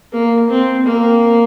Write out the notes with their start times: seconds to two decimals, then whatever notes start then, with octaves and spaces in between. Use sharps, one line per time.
0.13 A#3
0.50 C4
0.86 A#3